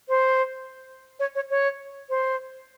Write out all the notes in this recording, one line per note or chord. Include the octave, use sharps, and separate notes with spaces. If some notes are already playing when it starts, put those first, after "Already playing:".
C5
C#5
C#5
C#5
C5